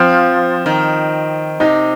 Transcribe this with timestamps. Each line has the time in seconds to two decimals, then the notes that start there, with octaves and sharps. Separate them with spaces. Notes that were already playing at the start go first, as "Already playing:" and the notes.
Already playing: F3 C4
0.66 D#3
1.60 C3 D#4